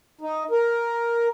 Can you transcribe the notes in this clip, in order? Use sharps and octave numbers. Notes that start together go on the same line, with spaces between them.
D#4
A#4